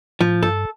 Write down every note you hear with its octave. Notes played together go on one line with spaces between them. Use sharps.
A2 F3
G2 A4